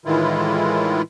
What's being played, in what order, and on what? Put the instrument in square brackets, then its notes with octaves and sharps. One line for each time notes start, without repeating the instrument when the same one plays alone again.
[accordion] A2 D#3 E3 G#3 E4 F4